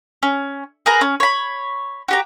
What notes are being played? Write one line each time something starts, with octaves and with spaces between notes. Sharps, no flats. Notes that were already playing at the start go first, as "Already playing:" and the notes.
C#4
G#4 A#4 B4 A#5
C#4
C#5 B5
F#4 G4 A#5